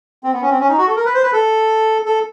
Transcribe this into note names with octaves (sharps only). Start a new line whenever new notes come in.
C4
B3
C#4
C4
C#4
D#4
F#4
A4
A#4
B4
C5
B4
A4
A4